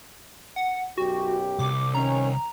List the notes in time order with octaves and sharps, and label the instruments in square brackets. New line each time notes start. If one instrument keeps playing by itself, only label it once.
[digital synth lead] F#5
[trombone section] B1 F#2 G4 [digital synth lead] F#4
[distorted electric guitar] C2 [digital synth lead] D6
[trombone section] D#3 C#4 [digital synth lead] A#5